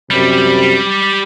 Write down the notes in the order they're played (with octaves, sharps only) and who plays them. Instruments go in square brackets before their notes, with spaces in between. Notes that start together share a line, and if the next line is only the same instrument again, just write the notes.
[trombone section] F#2 C3 [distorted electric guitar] G3